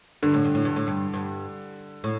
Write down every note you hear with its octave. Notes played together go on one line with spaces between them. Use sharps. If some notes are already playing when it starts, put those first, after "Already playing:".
G2 D3
A2
G2
A2
G2
A2
G2
G2
A2